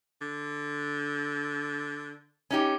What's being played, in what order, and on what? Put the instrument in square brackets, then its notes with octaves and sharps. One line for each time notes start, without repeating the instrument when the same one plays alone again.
[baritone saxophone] D3
[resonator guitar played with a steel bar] C#4 D#4 G4